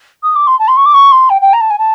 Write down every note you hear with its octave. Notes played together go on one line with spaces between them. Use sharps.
D#6
D6
C6
A5
C6
C#6
D6
C#6
C6
G5
G5
A#5
A5
G#5
A5